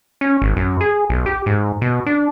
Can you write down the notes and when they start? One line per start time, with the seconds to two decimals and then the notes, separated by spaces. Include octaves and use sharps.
0.21 C#4
0.42 G#1
0.56 F#2
0.81 G#4
1.09 B1
1.26 G4
1.46 G#2
1.81 B2
2.06 D4